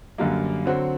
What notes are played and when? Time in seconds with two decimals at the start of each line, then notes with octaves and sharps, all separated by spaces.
0.18 F#2 D3 G3 A#3
0.66 D3 F#3 C4 F#4